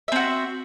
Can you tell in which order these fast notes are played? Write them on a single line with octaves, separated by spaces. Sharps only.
E5 C4 F#4